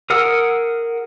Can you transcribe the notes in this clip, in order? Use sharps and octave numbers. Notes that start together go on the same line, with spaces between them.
G#4 A#4 F#5 D#6 E6